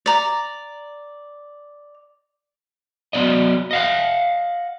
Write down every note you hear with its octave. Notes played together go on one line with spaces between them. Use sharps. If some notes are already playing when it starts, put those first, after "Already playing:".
D5 A#5
F#3 B3 D5 D#5
D#5 F5 F#5